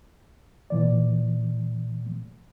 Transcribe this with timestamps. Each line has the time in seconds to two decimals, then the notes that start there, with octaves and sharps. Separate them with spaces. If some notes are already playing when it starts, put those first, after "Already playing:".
0.70 A#2 E3 D5